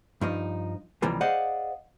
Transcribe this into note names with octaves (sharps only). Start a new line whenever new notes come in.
G2 F3 D#4
C#2 C3 E3 F3 G3 A#3
G#4 C5 D5 D#5 F5 F#5